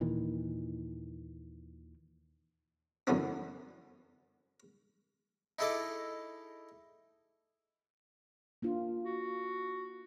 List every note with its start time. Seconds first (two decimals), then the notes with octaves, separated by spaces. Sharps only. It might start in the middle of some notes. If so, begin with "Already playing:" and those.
0.01 D#2 A#2 D#3 E3
3.07 F#2 D3 E3 B3 D4
5.59 D#4 E4 G#4 A4 D#5 D6
8.62 A#3 D4 F4
9.03 F#4